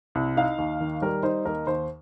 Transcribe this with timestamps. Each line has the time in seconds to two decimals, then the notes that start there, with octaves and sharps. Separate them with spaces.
0.15 C2
0.36 D#4 F5
0.58 D#2
0.80 D#3
1.01 G3 A#4
1.23 D#4 C5
1.45 D#2 A#4
1.67 D#2 C5